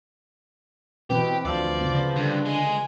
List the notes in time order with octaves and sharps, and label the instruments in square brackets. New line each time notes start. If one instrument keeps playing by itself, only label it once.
[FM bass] B2 [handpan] E3 C4 B4 [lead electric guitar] G4
[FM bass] D2 [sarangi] F3 [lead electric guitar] D5
[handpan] C#3 B3
[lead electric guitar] G2 [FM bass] D3
[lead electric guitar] G#3 [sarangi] G#5